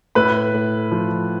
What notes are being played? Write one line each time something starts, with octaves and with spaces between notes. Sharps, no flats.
A2 B4 B5
A2
F3